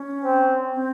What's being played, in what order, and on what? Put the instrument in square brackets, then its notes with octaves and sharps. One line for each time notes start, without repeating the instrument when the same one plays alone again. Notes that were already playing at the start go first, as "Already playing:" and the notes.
Already playing: [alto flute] C#4
[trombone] C4
[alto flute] C4